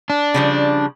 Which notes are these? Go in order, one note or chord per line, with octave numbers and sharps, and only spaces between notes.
D4
C#3 F3 G3